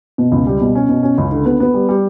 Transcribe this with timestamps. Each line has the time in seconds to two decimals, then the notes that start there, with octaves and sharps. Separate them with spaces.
0.18 B2
0.32 C#2
0.47 G3
0.61 B2
0.75 C#4
0.89 B2
1.03 C#4
1.18 C#2
1.32 D3
1.45 B3
1.60 B3
1.74 G3
1.89 G3